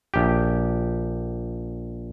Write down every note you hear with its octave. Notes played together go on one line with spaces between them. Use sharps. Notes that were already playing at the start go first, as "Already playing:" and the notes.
A#1 G4